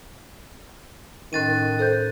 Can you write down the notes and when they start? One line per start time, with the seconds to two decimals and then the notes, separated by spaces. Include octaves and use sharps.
1.33 A2 D#3 C#4 F#6 A6 D#7
1.79 A4 C5 G6